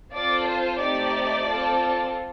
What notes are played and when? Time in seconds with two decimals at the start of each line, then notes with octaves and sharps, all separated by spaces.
0.13 C4 F4 A4 D5
0.47 C5
0.80 A3 C4 D#4 G4 D5
1.47 C4 F4 A4